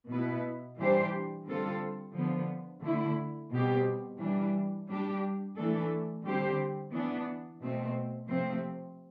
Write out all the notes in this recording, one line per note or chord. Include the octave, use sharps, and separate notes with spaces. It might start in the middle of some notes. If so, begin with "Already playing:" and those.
B2 B3 E4 B4
E3 G3 D4 G4 C5
D3 G3 C4 F4 A4
D3 F3 B3
D3 A3 E4
B2 G3 C4 G4
E3 G3 D4
G3 D4 G4
E3 A3 D4 A4
D3 G3 C4 G4 C5
E3 B3 D4
B2 A3 C4
C3 F3 A3 C4